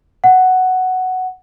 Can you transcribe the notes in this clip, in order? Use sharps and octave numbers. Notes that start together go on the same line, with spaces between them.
F#5